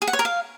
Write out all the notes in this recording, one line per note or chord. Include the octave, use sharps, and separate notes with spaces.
G#4
F#5
C#5
A#4
F5